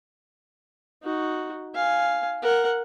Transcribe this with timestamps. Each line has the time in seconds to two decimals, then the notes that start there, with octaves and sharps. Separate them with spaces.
1.02 D#4 F#4
1.74 F5 G#5
2.42 A#4 F#5